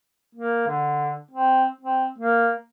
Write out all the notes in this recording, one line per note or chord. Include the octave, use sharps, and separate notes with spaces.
A#3
D3
C4
C4
A#3